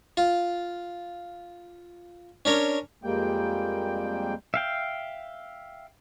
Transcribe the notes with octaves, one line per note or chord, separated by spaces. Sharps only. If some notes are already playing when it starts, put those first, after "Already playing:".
F4
C#4 D4 A#4 C#5
F2 G3 G#3 A#3 G5
E5 F5 G5